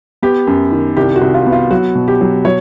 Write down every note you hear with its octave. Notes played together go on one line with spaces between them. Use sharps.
B3 G4
F#2
D#3
C2 G4
F#4
C2
F4
B3
F4
F#3 F#4
B2
G4
F#3
F#3 C#5